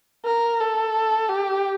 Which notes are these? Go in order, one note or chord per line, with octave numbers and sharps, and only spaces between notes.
A#4
A4
G4